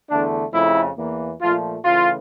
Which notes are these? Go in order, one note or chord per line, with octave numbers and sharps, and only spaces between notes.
E2 D3 A3 D4
F2 C#3 F3 A3 E4
E2 E3 A#3
A#2 F3 A3 F4
C#3 E3 A3 F4